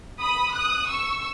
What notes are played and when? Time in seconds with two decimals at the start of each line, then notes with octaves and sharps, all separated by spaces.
0.21 B5 D#6
0.54 D#6 F#6
0.89 C#6 E6